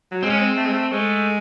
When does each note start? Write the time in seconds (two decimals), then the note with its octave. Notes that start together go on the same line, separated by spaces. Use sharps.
0.11 F#3
0.23 G#3 C4
0.30 C#4
0.38 C4
0.57 A3
0.66 G#3
0.73 A3
0.91 G#3 A3